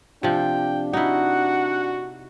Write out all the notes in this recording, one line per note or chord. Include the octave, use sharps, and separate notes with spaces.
C3 F3 D4 G5
D#4 E4 F#4 F#5